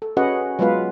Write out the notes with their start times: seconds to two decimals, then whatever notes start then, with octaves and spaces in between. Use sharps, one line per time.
0.02 A4
0.17 C#4 F#4 G#4 B4 D#5 F#5
0.59 F#3 G#3 B3 F4 B4 F5